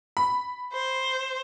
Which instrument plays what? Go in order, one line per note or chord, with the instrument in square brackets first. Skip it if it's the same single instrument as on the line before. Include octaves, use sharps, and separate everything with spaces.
[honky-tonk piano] B5
[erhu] C5